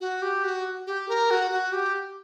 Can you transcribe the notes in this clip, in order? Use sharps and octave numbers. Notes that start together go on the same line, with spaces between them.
F#4
G4
F#4
G4
A#4
F#4
F#4
G4